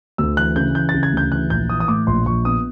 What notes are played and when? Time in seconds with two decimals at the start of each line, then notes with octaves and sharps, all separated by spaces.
0.18 D2 E6
0.37 E3 F#6
0.56 C#3 G6
0.75 E3 G6
0.89 A6
0.94 C#3
1.03 G#6
1.13 D2 G6
1.32 E3 F#6
1.50 A#1 G6
1.70 E3 D#6
1.80 D#6
1.88 A2 D6
2.07 A#1 C6
2.26 A#1 C#6
2.45 B3 D#6